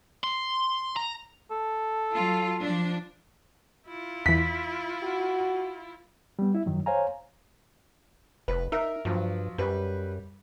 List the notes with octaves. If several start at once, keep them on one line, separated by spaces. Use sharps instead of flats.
C6
A#5
A4
F#3 F4
F3 D4
E4 F4
E2 E3 B6
F#4
G3 B3
E4 E5
F#2 D#3 F#3
C5 C#5 F5 G#5 A#5
F1 B4
D#4 A#4 E5
G2 F3 F#3
F#2 G3 B4